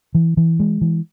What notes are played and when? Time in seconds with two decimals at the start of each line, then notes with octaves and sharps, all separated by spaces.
0.15 E3
0.37 E3
0.60 G#3
0.81 E3